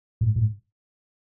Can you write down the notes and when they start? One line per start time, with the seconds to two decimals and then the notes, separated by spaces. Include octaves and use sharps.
0.21 G#2
0.36 G#2